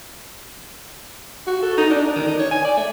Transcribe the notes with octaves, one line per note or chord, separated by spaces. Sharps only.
F#4
A4
D#4
D4
D#3
D#4
C#5
G#5
D5
A3